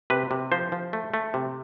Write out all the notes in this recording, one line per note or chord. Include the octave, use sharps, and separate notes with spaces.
C3 B4
C3
F3 C5
F3
A3
A3
C3